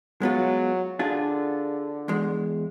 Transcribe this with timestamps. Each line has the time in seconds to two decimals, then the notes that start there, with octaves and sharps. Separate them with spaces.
0.22 F#3 G#3 B3 F4
0.99 D3 D4 F4 G#4
2.08 E2 G#3